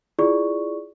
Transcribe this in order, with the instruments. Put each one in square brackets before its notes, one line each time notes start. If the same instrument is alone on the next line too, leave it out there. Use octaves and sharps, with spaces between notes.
[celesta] E4 F4 G#4 D5 C#6